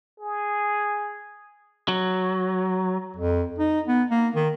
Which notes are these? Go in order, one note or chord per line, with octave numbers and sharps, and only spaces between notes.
G#4
F#3
F2
D#4
B3
A#3
D#3